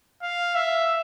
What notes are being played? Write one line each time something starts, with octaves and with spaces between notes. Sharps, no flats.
F5
E5